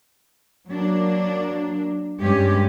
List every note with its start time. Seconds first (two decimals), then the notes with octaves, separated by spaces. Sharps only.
0.68 F#3 A#3 D4
2.20 G2 G#3 C#4 G4